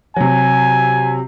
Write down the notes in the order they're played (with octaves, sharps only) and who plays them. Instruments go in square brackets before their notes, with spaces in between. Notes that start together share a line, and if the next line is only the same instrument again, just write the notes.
[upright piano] C3 F#3 [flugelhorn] G#5